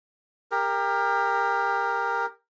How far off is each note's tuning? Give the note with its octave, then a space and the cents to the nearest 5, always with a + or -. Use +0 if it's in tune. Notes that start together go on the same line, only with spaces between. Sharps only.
G4 +25 A#4 +0